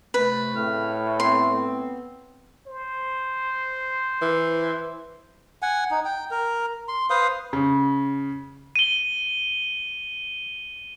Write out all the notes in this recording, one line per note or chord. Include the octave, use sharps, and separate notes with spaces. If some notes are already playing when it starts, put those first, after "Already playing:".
C3 A3 B4
A2 C#3 C4 F6
B3 C4 C6
C5
E3
F#5 G#5
D#4
G5
A#4
C6
B4 C5 F5 D#6
C#3
D#7 G7